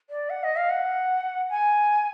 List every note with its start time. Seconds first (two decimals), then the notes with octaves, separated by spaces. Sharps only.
0.10 D5
0.30 F#5
0.44 D#5
0.57 F5
0.70 F#5
1.50 G#5